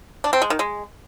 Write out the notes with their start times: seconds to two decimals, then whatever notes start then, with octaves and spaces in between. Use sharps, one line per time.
0.24 D4
0.33 C4
0.42 G#3
0.50 D#3
0.59 G#3